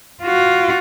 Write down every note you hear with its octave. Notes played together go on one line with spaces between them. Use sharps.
F4 F#4